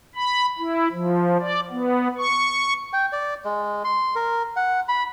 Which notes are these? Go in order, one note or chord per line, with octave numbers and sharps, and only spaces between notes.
B5
E4
F3
D5
B3
C#6
G5
D5
G#3
C6
A#4
F#5
B5